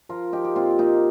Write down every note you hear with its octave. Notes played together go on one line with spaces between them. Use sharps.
F3 F4 A#4
F3 D#4 G4
G4
A#2 C4 F4
A#2 A#3 D#4